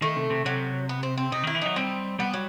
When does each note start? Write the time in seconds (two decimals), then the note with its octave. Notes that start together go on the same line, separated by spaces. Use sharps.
0.02 D#3 A3
0.16 C3
0.30 C3
0.45 C3 F#3
0.89 B3
1.03 C4
1.17 C4
1.32 C3 D#4
1.43 D#3 E4
1.55 E3
1.62 F#3 D#4
1.76 G3 C4
2.19 G3 B3
2.34 F#3